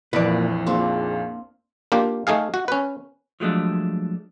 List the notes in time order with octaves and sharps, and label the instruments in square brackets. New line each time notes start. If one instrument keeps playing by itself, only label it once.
[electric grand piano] A#1 F2 [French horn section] A#2 [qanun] E3 F#5 [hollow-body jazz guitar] B4 D5
[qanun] A#3 C4 D4 [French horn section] D#4 F4 G#4
[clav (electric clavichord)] A#3 D4 F4 G4
A3 D#4 G#4 F5
F#4
C#4 B4
[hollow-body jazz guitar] F3 F#3 G#3 A3 D4